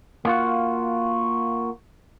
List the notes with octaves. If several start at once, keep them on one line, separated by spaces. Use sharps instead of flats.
A#3 F4 F#4